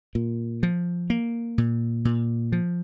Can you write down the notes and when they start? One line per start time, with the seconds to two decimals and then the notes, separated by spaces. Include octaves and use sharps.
0.15 A#2
0.63 F3
1.10 A#3
1.58 A#2
2.05 A#2
2.52 F3